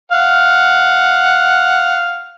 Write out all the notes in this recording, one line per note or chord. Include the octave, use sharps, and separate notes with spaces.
F5 F#5